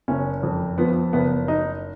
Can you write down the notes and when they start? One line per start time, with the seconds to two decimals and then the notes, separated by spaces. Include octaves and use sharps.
0.08 F#1 C#4
0.43 F2
0.78 F3 B3
1.13 F#1 B3
1.48 D#4